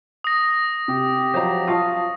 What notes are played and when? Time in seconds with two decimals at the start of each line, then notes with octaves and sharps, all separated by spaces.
0.24 D#6 A#6
0.88 C3 G4
1.34 F3 F#3 C5 A#5
1.67 F4 F5 A5 C#6 D#6